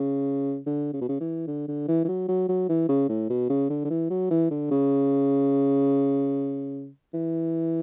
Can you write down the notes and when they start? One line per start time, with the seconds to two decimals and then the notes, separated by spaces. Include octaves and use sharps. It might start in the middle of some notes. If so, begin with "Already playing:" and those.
Already playing: C#3
0.67 D3
0.93 C#3
1.01 B2
1.09 C#3
1.20 E3
1.47 D3
1.68 D3
1.88 E3
2.05 E3
2.09 F#3
2.28 F#3
2.49 F#3
2.69 E3
2.89 C#3
3.09 A2
3.30 B2
3.50 C#3
3.70 D3
3.85 D3
3.90 E3
4.10 F#3
4.31 E3
4.51 D3
4.71 C#3
7.14 E3